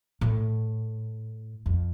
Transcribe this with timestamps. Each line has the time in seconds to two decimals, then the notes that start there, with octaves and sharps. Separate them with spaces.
0.21 A2
1.66 F2